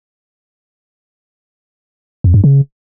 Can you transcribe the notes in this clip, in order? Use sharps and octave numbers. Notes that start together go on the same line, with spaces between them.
F2
G2
C#3